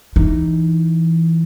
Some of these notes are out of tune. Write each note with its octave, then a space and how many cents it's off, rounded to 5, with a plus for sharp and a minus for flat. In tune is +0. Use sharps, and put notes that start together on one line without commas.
E3 +0 D#4 +0